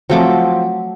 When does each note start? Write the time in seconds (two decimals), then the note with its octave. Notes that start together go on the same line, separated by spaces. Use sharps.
0.10 F3 F#3 A3 C4 D6